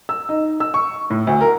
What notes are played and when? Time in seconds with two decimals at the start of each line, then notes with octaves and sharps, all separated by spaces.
0.09 E6
0.29 D#4
0.60 E6
0.74 C#6
1.10 A2
1.27 D2
1.41 A#4